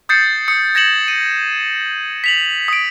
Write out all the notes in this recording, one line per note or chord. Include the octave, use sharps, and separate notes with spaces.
D#6 G6 A6 C7 C#7
D#6 C#7
G#6 A#6 C#7 E7 F#7
D#7
B6 F7 F#7
D#6 D7